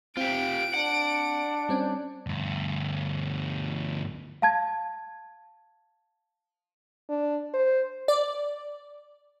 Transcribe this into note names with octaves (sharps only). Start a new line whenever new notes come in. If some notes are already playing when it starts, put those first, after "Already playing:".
C4 F4 G4 D7
D4 F#5
G3 C4 C#4
D2 G2
F5 A5 G#6
D4
C5
D5